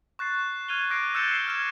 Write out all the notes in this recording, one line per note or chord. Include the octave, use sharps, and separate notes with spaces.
C#6 F#6 A6 C7
F6 F#6 G#6 D#7 F7 G7
D6 F6 F#6 A#6 C7 D7
E6 F#6 G6 A6 C#7 E7
E6 C7 E7 G7
E6 F6 G#6 E7